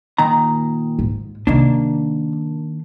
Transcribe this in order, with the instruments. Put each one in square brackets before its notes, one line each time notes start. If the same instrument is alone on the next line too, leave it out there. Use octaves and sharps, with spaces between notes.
[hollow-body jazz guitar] A#2 D#3 A#5
[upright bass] G#2
[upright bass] C3 D#4 [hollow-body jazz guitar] D#3 A#3 D4